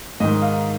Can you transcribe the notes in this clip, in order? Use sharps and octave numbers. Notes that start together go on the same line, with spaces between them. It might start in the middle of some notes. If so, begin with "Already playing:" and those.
G#2 D#3 D#5
F5